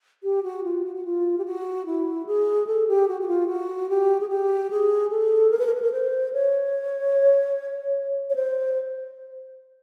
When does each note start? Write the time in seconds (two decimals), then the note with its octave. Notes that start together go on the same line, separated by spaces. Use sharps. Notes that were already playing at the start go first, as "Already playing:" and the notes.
0.23 G4
0.43 F#4
0.64 F4
0.84 F#4
0.95 F#4
1.05 F4
1.38 G4
1.45 F#4
1.86 E4
2.27 G#4
2.67 A4
2.88 G4
3.08 F#4
3.21 F#4
3.28 F4
3.47 F#4
3.89 G4
4.21 G#4
4.29 G4
4.70 G#4
5.10 A4
5.51 A#4
5.59 B4
5.66 A#4
5.74 B4
5.82 A#4
5.92 C5
6.33 C#5
8.30 C#5
8.35 C5